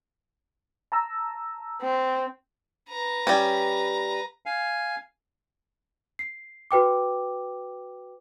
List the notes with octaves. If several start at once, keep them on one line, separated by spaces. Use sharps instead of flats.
A5 A#5 E6
C4
B4 A#5
G3 C#4
F5 G#5
C7
F#4 B4 G5 D6